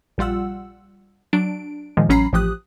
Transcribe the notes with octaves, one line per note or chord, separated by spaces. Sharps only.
A#1 G3 F4 F#5 E6
F#3 D4 D7
A#2 D#3 F3 G#3
A1 F#3 C#4 A#5 B5 C7
A1 F3 G4 D#6 F#6